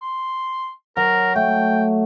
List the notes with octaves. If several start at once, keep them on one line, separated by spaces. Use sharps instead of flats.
C6
F#3 A#4
A3 G5